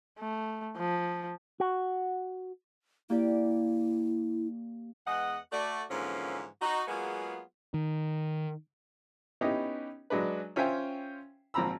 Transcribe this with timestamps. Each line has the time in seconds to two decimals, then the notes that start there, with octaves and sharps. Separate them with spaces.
0.19 A3
0.77 F3
1.60 F#4
3.10 A#3 E4 G4 D5
5.07 E2 G#3 B3 D#5 F#5
5.52 A3 F#4 D5
5.90 G#2 D3 E3 F3 A#3 C#4
6.62 D#4 F#4
6.88 F#3 G#3 A#3 B3 F4 G#4
7.74 D#3
9.41 B3 C#4 D#4 E4 G4 D#5
10.10 F#3 G#3 D4 B4
10.56 C#4 F4 C5 E5 G5 G#5
11.54 G#1 F3 C4 A#5 B5 E6